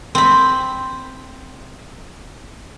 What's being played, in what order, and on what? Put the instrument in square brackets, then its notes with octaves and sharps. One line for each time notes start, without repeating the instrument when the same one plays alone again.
[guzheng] C4 B5